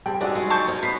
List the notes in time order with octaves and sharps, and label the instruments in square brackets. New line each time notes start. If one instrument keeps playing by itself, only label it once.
[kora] G3 C4 G#4 [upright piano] G5 A5
[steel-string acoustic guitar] G#3 C#4 [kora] D#4 F#4 A4 [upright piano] D5
[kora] F#3 C#4 C#5 [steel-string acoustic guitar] G#3
[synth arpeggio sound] A5 C#6 G6
[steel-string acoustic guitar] C#4 [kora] D#4
[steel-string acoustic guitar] B3 [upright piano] B5 B6 C7